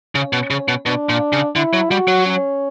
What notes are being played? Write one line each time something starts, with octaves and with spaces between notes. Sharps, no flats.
C#3 C#4
B2
C#3
B2
B2 D4
A#2
C#3
D3 E4
F#3
G3 F#4
F#3
C#4